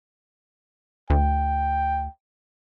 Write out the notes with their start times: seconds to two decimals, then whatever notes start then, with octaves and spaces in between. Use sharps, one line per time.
1.10 D2 G5